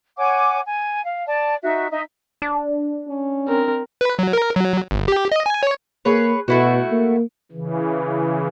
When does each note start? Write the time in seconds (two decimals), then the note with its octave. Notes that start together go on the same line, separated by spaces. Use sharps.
0.18 C#5 F#5 G#5 D6
0.65 G#5
1.03 F5
1.27 D5 A5
1.63 D#4 F#4 E5
1.91 D#4 D#5 E5
2.42 D4
3.08 C#4
3.48 C4 A#4
4.01 B4
4.19 F#3
4.33 A#4
4.56 F#3
4.91 G1
5.08 G4
5.32 D#5
5.46 G#5
5.63 C#5
6.05 A#3 G#4 B4 C#5
6.48 B2 A3 E4 F#4
6.91 A#3
7.52 C#3 E3